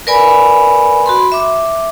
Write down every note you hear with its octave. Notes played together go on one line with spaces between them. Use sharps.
A#4 B4 D5 G#5 B5
F#4 B5 C6
E5 D6